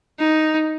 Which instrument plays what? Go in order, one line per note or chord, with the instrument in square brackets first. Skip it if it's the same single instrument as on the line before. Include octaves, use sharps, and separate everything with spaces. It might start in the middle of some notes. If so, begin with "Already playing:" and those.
[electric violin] D#4